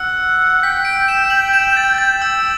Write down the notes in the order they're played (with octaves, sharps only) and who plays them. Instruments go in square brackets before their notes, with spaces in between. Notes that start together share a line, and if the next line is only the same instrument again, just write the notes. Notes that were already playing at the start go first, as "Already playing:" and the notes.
Already playing: [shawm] F#5 [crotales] E6
[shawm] G5 [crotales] B6
[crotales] D7
E7
F#7
E7
A6
A6
E6